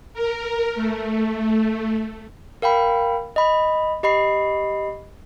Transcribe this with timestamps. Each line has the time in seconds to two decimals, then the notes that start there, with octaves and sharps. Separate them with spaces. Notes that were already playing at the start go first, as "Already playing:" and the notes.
0.14 A#4
0.75 A3
2.62 A#4 F5 G5 B5
3.36 D#5 B5
4.03 G4 D#5 B5 C7